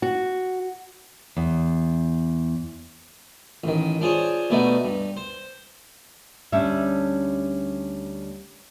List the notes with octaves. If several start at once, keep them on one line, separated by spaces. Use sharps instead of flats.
F#4
E2
A1 D#3
D4 F4 G#4 C5 C#5
B2 A3 B3 D4 D#4
G2
C5
D2 G3 C#4 D4 E5